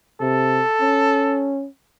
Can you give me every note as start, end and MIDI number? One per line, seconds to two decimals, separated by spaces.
0.21 0.62 48
0.21 1.54 69
0.81 1.67 61